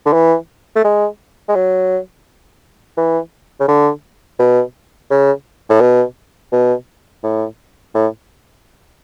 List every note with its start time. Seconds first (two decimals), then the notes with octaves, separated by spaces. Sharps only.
0.06 D3
0.13 E3
0.75 A3
0.84 G#3
1.49 G#3
1.55 F#3
2.97 E3
3.60 C#3
3.68 D3
4.39 B2
5.10 C#3
5.70 A2
5.81 B2
6.52 B2
7.23 A2
7.95 A2